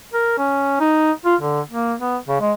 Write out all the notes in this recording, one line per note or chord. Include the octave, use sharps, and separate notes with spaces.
A#4
C#4
D#4
F4
D3
A#3
B3
C#3
G#3